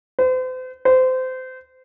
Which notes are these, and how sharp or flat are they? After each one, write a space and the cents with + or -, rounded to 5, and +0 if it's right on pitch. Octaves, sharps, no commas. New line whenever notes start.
C5 -40
C5 -25